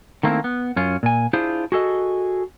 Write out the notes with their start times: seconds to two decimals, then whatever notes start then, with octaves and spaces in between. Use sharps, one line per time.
0.23 D#3 A3 A#3 C4 E4
0.44 B3
0.76 F#2 C#4 F4
1.03 A#2 G#5
1.33 D4 E4 F4 G#4 C5
1.72 F#4 G#4 A4 D#5